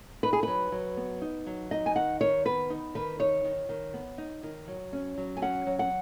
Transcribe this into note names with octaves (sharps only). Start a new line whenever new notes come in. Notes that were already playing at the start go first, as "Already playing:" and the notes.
D#4 B4
G#4
F#3 B4
F#3
B3
D#4
F#3
D#4 D#5
G#5
D#3 F#5
D#3 C#5
B3 B4
D#4
D#3 B4
D#4 C#5
D#3
D#3
B3
D#4
D#3
F#3
C#4
F#3
G#5
C#4 F#5
F#3
F#5